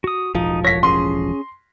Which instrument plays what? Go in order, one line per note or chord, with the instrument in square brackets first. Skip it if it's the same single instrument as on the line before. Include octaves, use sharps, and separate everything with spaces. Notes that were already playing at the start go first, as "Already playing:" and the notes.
[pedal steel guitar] F#4 D#6
[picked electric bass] E1 A1 F3 [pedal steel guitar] D#4
[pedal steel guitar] C#5 [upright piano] A#6 B6
[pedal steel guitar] C#4 G#4 [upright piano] C6